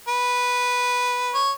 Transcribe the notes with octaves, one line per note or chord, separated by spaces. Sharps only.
B4
C#5